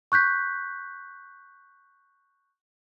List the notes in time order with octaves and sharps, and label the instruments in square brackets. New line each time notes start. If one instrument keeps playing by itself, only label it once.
[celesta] C#6 F#6 G6 B6